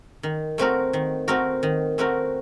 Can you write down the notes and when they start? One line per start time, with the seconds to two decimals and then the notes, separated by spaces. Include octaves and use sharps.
0.23 D#3
0.58 A3 C4 F#4 A#4
0.93 D#3
1.28 A3 C4 F#4 A#4
1.63 D#3
1.98 A3 C4 F#4 A#4